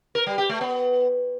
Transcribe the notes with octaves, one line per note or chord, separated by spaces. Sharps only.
A#4
G3
G4
A3
B3